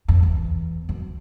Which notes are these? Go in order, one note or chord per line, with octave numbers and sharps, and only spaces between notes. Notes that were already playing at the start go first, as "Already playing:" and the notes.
F2
E2
F#2